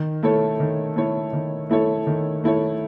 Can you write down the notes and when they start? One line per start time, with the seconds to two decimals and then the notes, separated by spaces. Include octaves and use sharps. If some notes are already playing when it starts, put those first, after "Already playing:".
Already playing: D#3
0.23 A3 E4 A4 C#5
0.60 D#3
0.96 A3 E4 A4 C#5
1.33 D#3
1.70 A3 E4 A4 C#5
2.07 D#3
2.44 A3 E4 A4 C#5